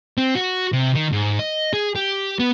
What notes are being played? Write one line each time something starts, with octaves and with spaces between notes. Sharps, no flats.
C4
F#4
C3
D#3
G#2
D#5
G#4
G4
B3